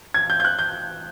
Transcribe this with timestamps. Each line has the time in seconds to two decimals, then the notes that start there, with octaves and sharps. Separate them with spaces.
0.14 G#6
0.30 G6
0.40 G6
0.45 F#6
0.59 G6